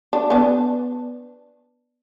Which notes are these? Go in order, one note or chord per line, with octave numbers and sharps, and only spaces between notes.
D4
B3 D4